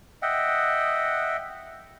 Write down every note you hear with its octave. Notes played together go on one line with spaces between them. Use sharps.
D#5 E5 F#5 G5